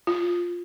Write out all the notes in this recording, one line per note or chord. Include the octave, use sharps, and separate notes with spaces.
F4